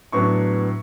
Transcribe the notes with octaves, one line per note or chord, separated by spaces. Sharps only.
A2 F#3 B3 D4 C#6